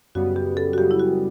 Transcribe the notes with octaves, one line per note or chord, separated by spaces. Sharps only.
F#2 C#3 G3 B3 F#4
G4
A4
F#4
F#2 C#3 G3 B3 G4
E4
F#4